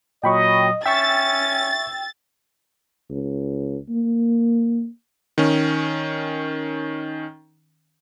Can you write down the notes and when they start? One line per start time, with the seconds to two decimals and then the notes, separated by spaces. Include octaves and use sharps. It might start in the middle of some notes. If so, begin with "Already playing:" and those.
0.24 A#2 F#3 D#5 G5 B5 C#6
0.86 C#4 E5 G5 C#6 E6 A6
3.10 C#2
3.89 A#3
5.38 D#3 C#4